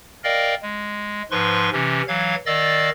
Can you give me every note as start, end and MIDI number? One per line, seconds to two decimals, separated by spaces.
0.24 0.55 70
0.24 0.55 74
0.24 0.55 75
0.24 0.55 77
0.24 0.55 79
0.62 1.22 56
1.31 1.70 44
1.31 1.70 53
1.31 1.70 71
1.31 1.70 84
1.31 1.70 85
1.73 2.02 48
1.73 2.02 52
1.73 2.02 61
2.08 2.35 52
2.08 2.35 54
2.08 2.35 77
2.08 2.35 92
2.46 2.90 51
2.46 2.90 74
2.46 2.90 75
2.46 2.90 77
2.46 2.90 88
2.46 2.90 93